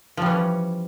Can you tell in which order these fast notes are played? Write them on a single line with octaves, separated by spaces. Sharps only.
F3 G3 E3 C#4